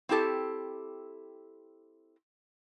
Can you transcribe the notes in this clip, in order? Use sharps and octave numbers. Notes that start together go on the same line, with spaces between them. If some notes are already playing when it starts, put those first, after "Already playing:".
C4 E4 G4 A4